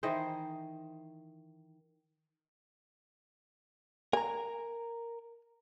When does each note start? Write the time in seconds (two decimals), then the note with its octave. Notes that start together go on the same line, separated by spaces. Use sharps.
0.03 D#3 E3 D#4 C5
4.13 A#4 G#5 A#5